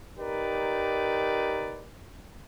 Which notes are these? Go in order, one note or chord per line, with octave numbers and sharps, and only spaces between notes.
D#4 G4 A#4 B4 D5